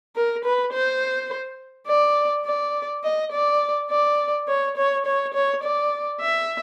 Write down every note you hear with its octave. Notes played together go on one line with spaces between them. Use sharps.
A#4
B4
C5
D5
D5
D#5
D5
D5
C#5
C#5
C#5
C#5
D5
E5